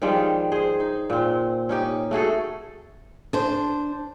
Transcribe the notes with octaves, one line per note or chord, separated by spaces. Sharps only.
D#3 F3 G3 G#3
G#4 C5
D#4
A#2 C4
C#4 D#4 G4
A3 F#4 G#4 A4
D4 C5